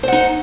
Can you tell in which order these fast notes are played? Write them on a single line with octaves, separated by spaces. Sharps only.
C5 F#5 D#4